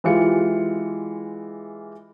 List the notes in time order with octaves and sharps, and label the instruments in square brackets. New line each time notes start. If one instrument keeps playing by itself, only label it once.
[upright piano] E3 G#3 F4 G4 C#7